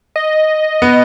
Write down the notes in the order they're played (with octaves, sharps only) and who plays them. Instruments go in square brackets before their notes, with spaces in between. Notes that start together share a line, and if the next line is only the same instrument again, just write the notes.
[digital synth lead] D#5
[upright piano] B3